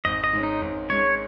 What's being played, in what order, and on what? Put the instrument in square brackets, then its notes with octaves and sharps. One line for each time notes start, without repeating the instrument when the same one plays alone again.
[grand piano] G#1 [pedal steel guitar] D#5
[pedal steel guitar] D#5
[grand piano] G#2 G#3 C#4
[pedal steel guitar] D#4
[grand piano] G#1
[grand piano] G#2 G#3 C#4 [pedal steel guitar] C#5